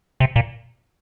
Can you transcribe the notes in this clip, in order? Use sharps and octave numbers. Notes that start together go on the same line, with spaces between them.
C3
A#2